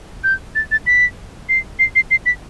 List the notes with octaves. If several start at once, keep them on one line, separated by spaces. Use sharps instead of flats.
G6
A6
A6
B6
C7
C7
C7
C7
B6